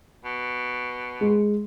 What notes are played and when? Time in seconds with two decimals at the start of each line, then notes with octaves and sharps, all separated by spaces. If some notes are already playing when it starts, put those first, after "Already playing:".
0.25 B2
1.21 G#3